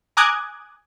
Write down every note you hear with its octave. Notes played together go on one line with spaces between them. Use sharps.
G#5 A#5 D6 D#6 F#6 G#6